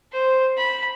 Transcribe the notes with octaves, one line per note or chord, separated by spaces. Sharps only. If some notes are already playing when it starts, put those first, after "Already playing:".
C5
B5